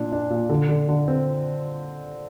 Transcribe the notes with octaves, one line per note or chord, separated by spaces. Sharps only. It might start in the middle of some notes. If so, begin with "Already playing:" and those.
Already playing: A#2 D4
D4
A#2
D3
D3
D3
C4